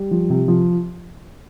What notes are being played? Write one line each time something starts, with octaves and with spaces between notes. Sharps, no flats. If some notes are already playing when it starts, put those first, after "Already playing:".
Already playing: G3
F3
C3
F3